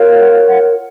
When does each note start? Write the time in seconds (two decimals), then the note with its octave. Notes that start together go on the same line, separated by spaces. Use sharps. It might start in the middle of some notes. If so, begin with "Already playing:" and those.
Already playing: F4 A#4 C#5
0.19 F#5
0.48 F#5